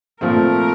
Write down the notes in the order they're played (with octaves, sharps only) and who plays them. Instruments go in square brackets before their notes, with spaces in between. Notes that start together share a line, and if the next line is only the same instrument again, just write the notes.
[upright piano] A#2 F3 A3 C4 [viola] A#4